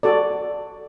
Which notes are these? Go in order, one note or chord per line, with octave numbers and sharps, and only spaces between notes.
F#4 A4 D5